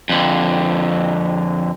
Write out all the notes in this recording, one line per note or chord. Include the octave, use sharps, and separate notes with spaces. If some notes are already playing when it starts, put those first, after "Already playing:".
F2 D3